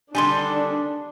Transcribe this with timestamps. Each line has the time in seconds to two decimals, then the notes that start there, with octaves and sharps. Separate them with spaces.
0.15 D3 D#3 G3 D4 G#5 C6